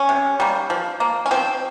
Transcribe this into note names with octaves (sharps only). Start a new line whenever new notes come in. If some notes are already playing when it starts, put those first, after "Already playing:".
Already playing: C#4
C3
G3 A#3
F3
A#3
C#4
F3 C4